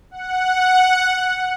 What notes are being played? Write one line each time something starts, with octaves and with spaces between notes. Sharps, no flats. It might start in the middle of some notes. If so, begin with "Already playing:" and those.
F#5